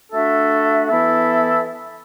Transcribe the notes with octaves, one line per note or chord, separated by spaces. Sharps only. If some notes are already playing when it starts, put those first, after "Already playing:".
A3 D4 F#4 A4 E5
E3 B3 E4 A4 E5